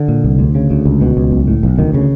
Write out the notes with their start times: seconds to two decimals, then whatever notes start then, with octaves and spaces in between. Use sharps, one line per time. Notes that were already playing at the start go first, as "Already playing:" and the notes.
Already playing: D3
0.08 A#2
0.24 C2
0.39 D2
0.55 C#3
0.71 D2
0.85 C#2
1.01 B2
1.17 C#2
1.32 B1
1.48 A2
1.63 B1
1.79 D2 D#3
1.94 C#3